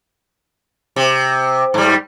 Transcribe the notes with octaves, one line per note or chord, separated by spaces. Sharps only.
C3
G#2 G3